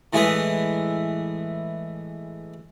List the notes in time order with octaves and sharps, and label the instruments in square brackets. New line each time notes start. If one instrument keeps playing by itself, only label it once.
[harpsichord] A2 E3 G#3 E4 G#4 B4